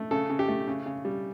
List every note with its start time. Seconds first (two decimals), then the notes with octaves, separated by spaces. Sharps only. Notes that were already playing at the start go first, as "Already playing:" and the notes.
Already playing: A3
0.11 C#3 A4
0.30 C#3
0.39 G4
0.48 A3
0.67 C#3
0.86 C#3
1.05 G3